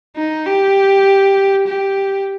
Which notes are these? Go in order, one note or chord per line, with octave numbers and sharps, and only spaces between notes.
D#4
G4
G4